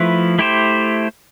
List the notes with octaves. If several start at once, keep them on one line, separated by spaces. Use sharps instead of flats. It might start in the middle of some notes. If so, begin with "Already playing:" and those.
Already playing: F3 A3 E4 B4
A3 E4 G4 C5